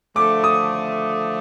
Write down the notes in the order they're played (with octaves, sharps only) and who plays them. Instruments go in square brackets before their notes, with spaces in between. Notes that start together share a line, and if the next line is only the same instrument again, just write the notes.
[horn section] D3 F3 A3 [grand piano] D6
[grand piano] D#6